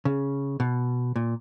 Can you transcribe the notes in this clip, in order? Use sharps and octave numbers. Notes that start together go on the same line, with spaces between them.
C#3
B2
A#2